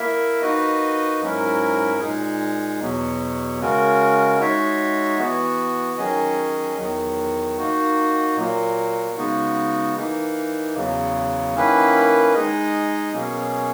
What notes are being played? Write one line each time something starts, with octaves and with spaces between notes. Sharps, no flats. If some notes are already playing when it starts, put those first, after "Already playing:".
Already playing: A#3 E4 A#4 E5
A#3 D#4 F#4 B4 D#5
G#2 F#3 C#4 E4 A#4
A#2 G#3 D#4 G#4
E2 B2 F#3
C#3 G#3 C#4 F#4 A#4
G#3 D#4 F#4 C#5 E5
E3 B3 F#4
D#3 F#3 C#4 G#4 D#5
E2 D#3 F#3
A#3 D#4 F#4
A#2 F#3 A#3
C#3 G#3 B3 D#4 F#4
E3 A#3 D#4
E2 C#3 F#3
D#3 A#3 C#4 E4 B4
G#3 D#4 G#4 D#5
B2 F#3 A#3 C#4 G#4